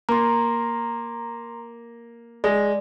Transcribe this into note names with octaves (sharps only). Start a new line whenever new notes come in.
A#3 A#5 C6
G#3 D5